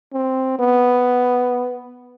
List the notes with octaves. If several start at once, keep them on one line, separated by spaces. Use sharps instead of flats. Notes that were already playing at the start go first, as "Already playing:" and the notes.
C4
B3